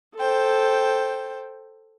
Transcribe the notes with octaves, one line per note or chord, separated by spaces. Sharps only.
A4 C5 G5